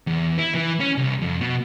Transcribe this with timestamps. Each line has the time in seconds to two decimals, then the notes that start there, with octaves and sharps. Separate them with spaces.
0.07 E2
0.39 E4
0.55 E3
0.80 C#4
0.98 C2
1.21 F2
1.41 B2